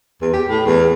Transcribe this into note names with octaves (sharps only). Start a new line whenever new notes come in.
E2
G4
A2
E2